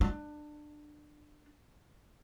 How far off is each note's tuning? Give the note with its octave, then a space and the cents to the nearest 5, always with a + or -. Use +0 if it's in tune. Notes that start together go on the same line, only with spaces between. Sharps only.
D4 +25